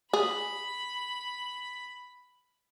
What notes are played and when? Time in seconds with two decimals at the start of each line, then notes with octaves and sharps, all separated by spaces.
0.13 G#4 B5